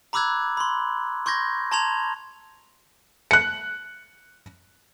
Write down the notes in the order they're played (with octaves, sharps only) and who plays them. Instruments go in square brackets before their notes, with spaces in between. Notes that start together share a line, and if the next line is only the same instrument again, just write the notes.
[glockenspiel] A#5 B5 D6 E6 F#6 G#6
B5 C6
C6 C#6 G6 G#6 A#6
A5 A#5 C6 G#6 F7
[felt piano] F#6 C#7